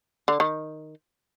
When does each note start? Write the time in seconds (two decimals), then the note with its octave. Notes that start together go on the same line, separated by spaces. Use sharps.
0.28 D3
0.40 D#3